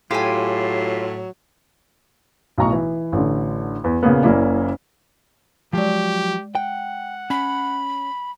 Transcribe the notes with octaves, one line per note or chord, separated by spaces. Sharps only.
A2 F#3 F4 G4 G#5
B1 A2 A#5 C#6
E3
A1 D3
E2
A#2 C#3 A#3 B3
F#1 A#3 C#4 E4 D5
F3 F#3 G#3 G4 D5
F#5 G5
C#4 B5